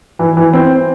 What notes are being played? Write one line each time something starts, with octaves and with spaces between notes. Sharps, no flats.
E3
E3
C4